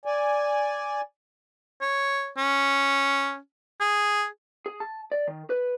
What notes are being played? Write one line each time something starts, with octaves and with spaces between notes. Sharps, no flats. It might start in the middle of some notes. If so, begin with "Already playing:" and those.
D5 G#5
C#5
C#4
G#4
G#4
A5
D5
D#3
B4